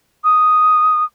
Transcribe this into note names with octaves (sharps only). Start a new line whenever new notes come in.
D#6